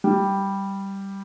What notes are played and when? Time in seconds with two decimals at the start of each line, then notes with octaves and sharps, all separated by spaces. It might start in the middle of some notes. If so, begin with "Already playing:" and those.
0.04 G3